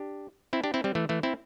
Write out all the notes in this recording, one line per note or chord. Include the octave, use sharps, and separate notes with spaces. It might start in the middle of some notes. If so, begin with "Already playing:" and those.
Already playing: D4 G4
C4 E4
D4 G4
C4 E4
G3 C4
E3 A3
E3 A3
C4 E4